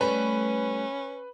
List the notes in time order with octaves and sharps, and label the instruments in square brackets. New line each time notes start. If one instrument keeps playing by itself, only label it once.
[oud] G3 A3 [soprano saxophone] C#4 [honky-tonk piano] B4